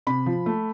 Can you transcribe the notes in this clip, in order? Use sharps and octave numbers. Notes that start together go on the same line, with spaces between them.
C3 B5
F3
A3